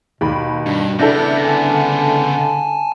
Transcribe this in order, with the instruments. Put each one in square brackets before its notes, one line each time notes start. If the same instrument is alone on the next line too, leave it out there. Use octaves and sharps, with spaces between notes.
[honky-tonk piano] D#2 B5 [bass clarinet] B2
[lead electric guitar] G2 [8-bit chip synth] D4
[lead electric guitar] C#3 B3 [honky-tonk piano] D4 E4 A4 [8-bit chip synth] G6 A#6
[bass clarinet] D3 [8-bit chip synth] G#5 A5
[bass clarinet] D3